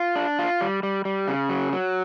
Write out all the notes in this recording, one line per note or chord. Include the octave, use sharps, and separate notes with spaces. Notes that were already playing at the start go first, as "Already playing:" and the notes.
Already playing: F4
D4
F4
G3
G3
G3
C#3
F#3
F#3